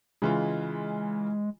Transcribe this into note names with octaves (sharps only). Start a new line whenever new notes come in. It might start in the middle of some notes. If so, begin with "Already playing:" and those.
C#3 E3 G#3 F4